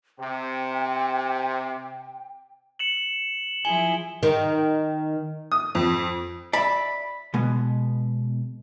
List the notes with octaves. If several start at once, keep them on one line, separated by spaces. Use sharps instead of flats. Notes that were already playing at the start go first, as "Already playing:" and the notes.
C3 G5
C#7 E7 F#7
F3 E4 G#4 G#5 G7
D#3
D#6
F2
D5 E5 B5
B2 G#3 B3